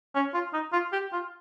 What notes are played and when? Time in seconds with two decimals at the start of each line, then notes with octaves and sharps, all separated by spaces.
0.15 C#4
0.34 F4
0.53 D#4
0.73 F4
0.93 G4
1.13 F4